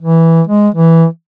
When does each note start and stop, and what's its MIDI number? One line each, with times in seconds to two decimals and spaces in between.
0.01 0.41 52
0.47 0.69 56
0.75 1.05 52